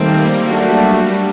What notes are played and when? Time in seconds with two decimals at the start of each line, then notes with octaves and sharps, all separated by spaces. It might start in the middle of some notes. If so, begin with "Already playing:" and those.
Already playing: D#3 G3 A3 A#3 C4
0.44 F#3 G3 A3 D4 F#4